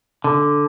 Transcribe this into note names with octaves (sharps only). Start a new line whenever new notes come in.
D3